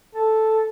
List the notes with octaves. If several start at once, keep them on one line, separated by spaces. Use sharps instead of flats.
A4